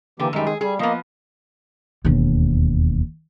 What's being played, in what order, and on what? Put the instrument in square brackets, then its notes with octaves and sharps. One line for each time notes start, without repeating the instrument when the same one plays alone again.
[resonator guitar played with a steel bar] D3 [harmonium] E3 A#3 G4
[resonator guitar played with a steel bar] F#2 G3 [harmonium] D#3 G#3
[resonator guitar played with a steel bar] G#4
[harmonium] G3 [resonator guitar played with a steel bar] G#4
[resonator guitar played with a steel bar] F3 B3 [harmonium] A#3 D#5
[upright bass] E1 D#2